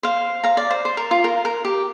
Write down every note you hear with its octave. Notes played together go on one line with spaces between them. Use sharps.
C5 F5
F5 A#5
D5
C5
C5
A#4
F4
A#4
A#4
G4